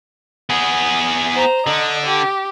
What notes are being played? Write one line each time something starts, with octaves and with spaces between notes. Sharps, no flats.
B3 G#4
C5 A#5
D3 D#5
G4